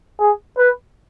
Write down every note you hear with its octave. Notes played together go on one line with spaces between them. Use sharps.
G#4
B4